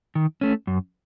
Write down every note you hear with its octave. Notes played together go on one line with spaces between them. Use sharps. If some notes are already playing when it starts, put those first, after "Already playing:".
D#3
A3 C#4
F#2